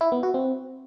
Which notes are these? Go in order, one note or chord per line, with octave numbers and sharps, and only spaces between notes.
E4
B3
F#4
C4